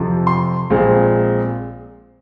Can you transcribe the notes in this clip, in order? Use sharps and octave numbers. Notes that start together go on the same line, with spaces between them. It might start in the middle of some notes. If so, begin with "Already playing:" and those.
Already playing: F2 C3 F3
C6
A#1 A#2 G#3 C4